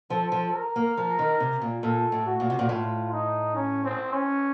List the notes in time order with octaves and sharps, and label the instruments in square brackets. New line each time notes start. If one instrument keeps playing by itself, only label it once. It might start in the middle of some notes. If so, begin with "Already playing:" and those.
[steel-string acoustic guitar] F3 [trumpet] A4
[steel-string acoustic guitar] F3
[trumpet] A#4
[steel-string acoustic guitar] A#3
F3
D#3
C3
A#2
[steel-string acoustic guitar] A#2 [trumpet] A4
[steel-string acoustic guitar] A2
[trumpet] F#4
[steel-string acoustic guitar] A#2
C3
A#2
[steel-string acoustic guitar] A2 [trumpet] F4
[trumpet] D#4
C#4
C4
C#4